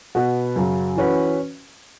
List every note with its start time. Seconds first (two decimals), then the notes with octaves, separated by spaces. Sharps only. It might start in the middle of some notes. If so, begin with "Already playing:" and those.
0.15 B2 B3 F#4 B4
0.56 F#2 C#3 F#3
0.97 E3 C#4 F#4 B4